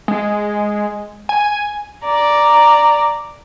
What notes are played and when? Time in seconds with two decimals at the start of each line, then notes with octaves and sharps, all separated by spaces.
0.08 G#3
1.29 G#5
2.04 D5 A#5